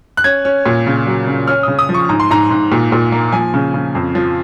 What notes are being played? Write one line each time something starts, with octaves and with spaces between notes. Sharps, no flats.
F#6
C#4 G#6
C#4
A#2
C#3
F#3
C#3
C#4 F6
C#3 D#6
D#6
F3
C#6
G#2 A#5
C6
G#2 A#5
G#2
A#2
A#2
A#3
F3 G#5
C#3
C#3
F2
F3